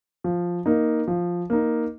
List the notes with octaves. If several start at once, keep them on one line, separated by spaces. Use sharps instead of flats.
F3
A#3 D#4
F3
A#3 D#4